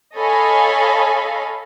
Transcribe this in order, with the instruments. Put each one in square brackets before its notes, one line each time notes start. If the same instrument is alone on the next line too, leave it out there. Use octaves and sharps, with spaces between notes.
[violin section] A4 C#5 D#5 F5 G#5 B5